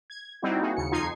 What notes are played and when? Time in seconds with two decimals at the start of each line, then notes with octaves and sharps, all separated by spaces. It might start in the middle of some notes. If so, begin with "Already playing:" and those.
0.10 G#6
0.42 G3 C4 D#4 E4 F#4
0.61 A#3 D#4 F#4 G#4
0.77 D#2 C#3 C#7
0.91 F2 F3 D#4 D#5 G#6 C7